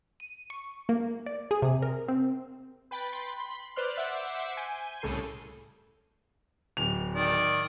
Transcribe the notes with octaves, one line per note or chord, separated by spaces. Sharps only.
D#7
C#6
A#3
D5
G#4
C3
A#4
C4
B4 G5 B5 A6
B5 C6
B4 C5 D5 C6 F6 F#6
C5 E5 F#5 D6
G#5 G6
C2 A2 C#3 A4 G6 C7
D1 F7
D#3 D5